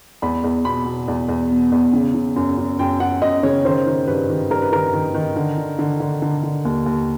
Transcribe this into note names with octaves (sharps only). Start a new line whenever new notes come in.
E2 B5
E2
B2 B5
B2
E2
E2
B2
E2
C#3
C#3
F#2
F#2
F#2 G5
F#2 F#5
F#2 D#5
C#3 C#5
D#3 C5
D#3
G2 B4
D#3
G2 A#4
B4
D#3 A#4
D#3
D#3
D3
D3
D3
D3
D3
D3
D#2
D#2